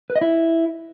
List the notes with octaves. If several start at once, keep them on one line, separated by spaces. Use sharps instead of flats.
B4
D#5
E4